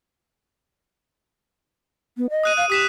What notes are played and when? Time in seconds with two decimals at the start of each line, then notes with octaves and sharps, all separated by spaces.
2.17 B3
2.30 D#5
2.44 D#6 F#6 D#7
2.57 F5 F#6
2.70 G4 D#6 B6 E7